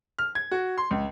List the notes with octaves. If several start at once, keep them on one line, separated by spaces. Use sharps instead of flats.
F6
G#6
F#4
C6
C#2